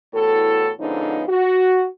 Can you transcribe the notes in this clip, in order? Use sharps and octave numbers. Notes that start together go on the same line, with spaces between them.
E2 A2 F#4 A4
G#2 D3 F3 B3 C#4 D#4
F#4